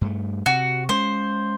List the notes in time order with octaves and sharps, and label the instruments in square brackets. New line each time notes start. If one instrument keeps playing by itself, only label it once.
[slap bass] G2 A3
[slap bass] C3 [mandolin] F#4
[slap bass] G#3 C#4 [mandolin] C5